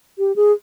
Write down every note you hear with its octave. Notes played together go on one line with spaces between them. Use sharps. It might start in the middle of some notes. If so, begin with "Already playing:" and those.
G4
G#4